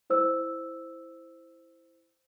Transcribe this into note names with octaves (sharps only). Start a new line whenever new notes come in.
E4 C5 E6